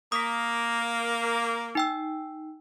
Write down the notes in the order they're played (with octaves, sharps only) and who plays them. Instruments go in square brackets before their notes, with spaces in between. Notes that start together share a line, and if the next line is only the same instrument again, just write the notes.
[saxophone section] A#3 [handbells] D#6 B6
[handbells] D#4 G5 E6